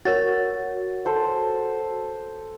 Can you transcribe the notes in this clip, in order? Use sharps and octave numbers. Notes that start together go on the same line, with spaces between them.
F#4 A#4 C#5 A6
A4 C5 F#5